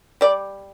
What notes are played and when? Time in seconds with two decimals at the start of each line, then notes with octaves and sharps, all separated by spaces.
0.21 G3 D5